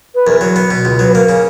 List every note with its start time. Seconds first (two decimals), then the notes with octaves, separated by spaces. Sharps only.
0.15 B4
0.27 E2 A#4
0.41 F#3
0.56 B3
0.71 B2
0.85 C#2
0.99 F#3 B4
1.15 A#3 A#4
1.29 C#3